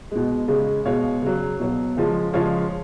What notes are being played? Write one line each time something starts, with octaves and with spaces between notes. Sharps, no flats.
B2 G#3
C#3 G#3
B2 G#3 C#5 F5
C#3 F#3
B2 F#3
C#3 F3 G#3
C#3 F3 G#3 C#5 F5